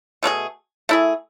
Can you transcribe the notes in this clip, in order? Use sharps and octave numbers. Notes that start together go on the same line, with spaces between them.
B2 A3 C#4 G#4
A3 E4 G#4